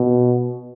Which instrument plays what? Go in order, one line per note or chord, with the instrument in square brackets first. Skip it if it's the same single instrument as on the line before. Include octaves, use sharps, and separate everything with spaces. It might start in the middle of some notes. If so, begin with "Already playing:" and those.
Already playing: [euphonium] B2